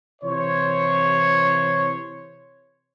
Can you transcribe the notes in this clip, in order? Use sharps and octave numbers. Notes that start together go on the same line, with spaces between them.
C3 E3 C5 C#5